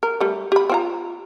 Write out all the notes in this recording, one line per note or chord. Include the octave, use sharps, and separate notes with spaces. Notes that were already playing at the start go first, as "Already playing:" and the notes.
A#4
G3 A3
G4 B5
C4 F4 A#5